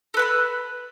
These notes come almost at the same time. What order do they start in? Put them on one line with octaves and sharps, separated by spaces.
A4 B4 A5 B5